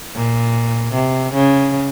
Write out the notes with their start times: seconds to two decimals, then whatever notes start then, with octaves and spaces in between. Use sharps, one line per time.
0.15 A#2
0.94 C3
1.34 C#3